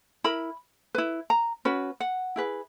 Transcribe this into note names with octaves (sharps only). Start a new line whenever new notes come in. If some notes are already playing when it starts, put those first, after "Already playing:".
E4 A#4 B5
E4 B4
A#5
C#4 F#4 B4
F#5
E4 G#4 B4